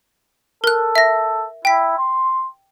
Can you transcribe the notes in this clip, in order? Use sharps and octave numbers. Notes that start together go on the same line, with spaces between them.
A4 A#4 F#6
E5 A#6
E4 G5 B6
C6